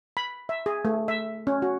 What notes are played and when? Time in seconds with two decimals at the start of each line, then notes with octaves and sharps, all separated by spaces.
0.17 B5
0.49 E5
0.66 G#4
0.85 A3
1.08 E5
1.47 C#4
1.62 F#4